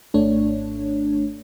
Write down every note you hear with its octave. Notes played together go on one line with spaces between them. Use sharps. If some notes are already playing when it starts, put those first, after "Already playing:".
G#1 A3 D4 C#5